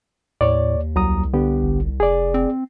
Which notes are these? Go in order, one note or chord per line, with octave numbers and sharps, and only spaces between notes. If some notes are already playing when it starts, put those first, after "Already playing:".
D#2 A2 C#5 D5
C2 F#3 A#5 D#6
D3 B3 G4
G1
F1 G#4 D5
C4